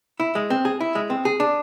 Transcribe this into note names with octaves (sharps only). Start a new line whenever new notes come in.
E4
G#3
C4
G#4
E4
G#3
C4
G#4
D4